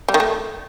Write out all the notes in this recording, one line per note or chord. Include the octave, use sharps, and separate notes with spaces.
G3
D#3
A3